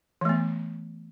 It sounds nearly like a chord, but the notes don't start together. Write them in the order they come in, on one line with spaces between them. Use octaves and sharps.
E3 A3 B3